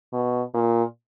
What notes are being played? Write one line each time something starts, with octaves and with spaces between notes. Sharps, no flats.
B2
A#2